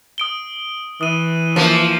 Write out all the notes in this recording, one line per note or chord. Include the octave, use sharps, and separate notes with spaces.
D#6 D7 G7
E3 D#6 D#7
F3 A#3